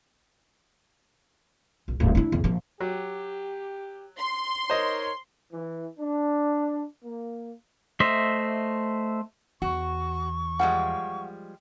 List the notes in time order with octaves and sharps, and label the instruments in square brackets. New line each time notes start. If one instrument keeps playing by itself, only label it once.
[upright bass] A#1
D1 G#2
D4 E4
E2
A#1 F3
[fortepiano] F#3 [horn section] G4
[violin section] C6
[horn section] D#4 A#4 C#5 [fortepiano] C5 D#5
[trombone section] E3
D4
A#3
[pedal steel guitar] A3 C5 D#5 E5
[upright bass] E2 [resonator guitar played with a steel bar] F#4 [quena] C#6
[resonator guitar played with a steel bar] F3 G3 G#3 [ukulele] F5 F#5